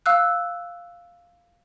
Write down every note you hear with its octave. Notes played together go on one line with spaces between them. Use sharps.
F5 E6 F#6